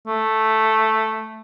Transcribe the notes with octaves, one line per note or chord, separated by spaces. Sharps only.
A3